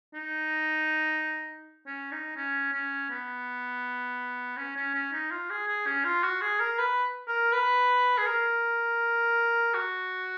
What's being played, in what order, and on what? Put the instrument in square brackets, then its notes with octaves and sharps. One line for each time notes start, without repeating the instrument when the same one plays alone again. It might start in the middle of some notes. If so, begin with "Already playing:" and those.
[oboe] D#4
C#4
D#4
C#4
C#4
B3
C#4
C#4
C#4
D#4
F4
G#4
G#4
C#4
F4
F#4
G#4
A#4
B4
A#4
B4
G#4
A#4
F#4